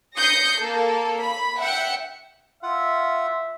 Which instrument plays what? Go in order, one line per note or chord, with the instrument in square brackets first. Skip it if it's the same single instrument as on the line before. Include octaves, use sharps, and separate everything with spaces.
[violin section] D#6 G6 A#6 C7 C#7
A#3 A4
B5
E5 F#5 G5 C#7
[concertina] F4 F#5 [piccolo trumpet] E5